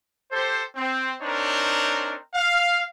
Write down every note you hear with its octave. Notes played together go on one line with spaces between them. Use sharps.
G4 A4 C5
C4
C4 D4 D#4 A#4 C#5
F5